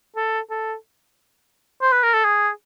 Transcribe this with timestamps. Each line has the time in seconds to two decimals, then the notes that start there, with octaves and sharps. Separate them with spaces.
0.16 A4
0.50 A4
1.82 C5
1.92 B4
2.03 A#4
2.14 A4
2.24 G#4